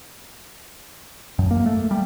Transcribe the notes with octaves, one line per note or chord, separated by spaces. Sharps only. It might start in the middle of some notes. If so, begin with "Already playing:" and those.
F#2
A#3
A3
G3